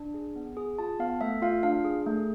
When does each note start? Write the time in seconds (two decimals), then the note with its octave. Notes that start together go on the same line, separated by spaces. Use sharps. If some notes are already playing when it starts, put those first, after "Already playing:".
Already playing: D4
0.14 G#4
0.36 B3
0.57 G#4
0.79 F4 A5
1.00 B3 F5
1.21 A3 E5
1.42 F4 F5
1.63 D4 F5
1.85 G#4
2.06 A3